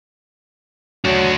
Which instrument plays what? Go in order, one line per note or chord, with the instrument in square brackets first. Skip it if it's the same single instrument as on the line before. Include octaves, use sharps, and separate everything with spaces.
[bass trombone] F#3 [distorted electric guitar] D4 F#4